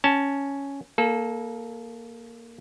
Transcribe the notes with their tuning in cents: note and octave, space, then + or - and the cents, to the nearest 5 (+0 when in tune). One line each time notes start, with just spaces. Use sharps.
C#4 +0 A5 +0
A#3 +0 A4 -25